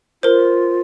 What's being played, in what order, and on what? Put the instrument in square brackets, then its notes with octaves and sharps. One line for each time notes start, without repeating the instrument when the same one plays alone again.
[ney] F4 [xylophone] A#4 C5